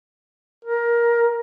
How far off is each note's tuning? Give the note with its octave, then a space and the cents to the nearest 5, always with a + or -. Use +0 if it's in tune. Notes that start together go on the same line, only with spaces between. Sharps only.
A#4 +15